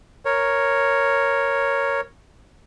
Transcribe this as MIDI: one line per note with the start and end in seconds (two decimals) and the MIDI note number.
0.25 2.01 70
0.25 2.01 73